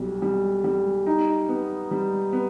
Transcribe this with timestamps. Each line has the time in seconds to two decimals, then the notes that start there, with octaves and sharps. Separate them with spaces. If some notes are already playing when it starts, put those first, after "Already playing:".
Already playing: B1 G3
0.22 G3
0.64 G3
1.06 D#4
1.48 B3
1.91 G3
2.33 B3